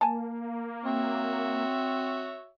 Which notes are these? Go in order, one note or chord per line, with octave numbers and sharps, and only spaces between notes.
A#3 G#5 A5
C4 F#4 C#5 E5